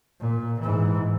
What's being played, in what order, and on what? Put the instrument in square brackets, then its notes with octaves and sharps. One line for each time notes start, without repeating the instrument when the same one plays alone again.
[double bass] A#2
G#2 E3